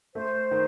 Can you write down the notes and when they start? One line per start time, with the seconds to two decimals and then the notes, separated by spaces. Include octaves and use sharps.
0.14 A3 C5
0.51 D#3